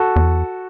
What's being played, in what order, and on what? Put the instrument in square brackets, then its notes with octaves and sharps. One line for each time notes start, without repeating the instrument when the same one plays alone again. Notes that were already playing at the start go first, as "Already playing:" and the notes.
Already playing: [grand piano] F#4 A4
[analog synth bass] E2